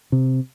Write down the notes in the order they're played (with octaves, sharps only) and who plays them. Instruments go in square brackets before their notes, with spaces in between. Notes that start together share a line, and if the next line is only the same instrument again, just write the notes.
[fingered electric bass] C3